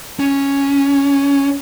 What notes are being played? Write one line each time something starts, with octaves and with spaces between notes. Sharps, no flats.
C#4